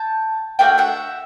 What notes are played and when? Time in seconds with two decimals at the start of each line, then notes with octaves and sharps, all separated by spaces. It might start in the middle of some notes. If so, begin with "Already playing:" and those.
Already playing: G5 A5
0.59 A3 D4 F#4 F5 G5
0.78 E5 F#5